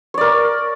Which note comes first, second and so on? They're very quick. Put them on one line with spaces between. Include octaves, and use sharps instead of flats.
C#5 D5 A#4